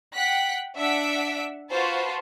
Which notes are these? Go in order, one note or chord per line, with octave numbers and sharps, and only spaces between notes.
F#5 G5 F#6 B6
D4 E5 F#5 E6 B6 D7
F4 F#4 B4 C5 A5